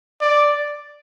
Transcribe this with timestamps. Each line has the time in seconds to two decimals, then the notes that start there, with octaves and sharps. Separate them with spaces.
0.21 D5